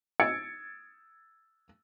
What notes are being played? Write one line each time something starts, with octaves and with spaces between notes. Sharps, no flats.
E6 G#6 A6 C#7 D7